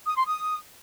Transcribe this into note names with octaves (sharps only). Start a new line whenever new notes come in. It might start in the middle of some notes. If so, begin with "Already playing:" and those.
D#6
C6
D#6